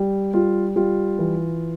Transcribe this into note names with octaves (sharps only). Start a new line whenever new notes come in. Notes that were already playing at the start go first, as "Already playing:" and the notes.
Already playing: G3
G3 F4
G3 F4
E3